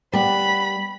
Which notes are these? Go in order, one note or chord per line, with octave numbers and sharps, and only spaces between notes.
G3 B3 B5